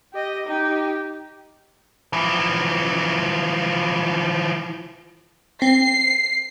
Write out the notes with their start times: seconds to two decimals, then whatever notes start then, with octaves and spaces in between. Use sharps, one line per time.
0.13 G4 D#5
0.47 D#4 G4
2.13 E3 F3
5.62 C4 C7